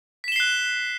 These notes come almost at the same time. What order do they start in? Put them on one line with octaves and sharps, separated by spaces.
B6 E7 G7 C7 F#6